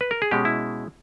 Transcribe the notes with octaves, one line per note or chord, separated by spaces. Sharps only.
B4
A#4
G#4
B2 G#3 C#4 G4
E4